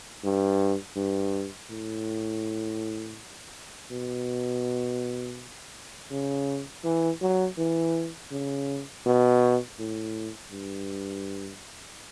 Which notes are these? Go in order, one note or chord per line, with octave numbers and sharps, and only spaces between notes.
G2
G2
A2
B2
C#3
E3
F#3
E3
C#3
B2
A2
G2